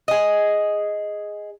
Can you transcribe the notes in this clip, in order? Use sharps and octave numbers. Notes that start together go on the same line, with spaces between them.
G#4 D#5